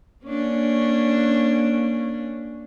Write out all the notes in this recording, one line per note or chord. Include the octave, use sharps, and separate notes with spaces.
A#3 C#4 D4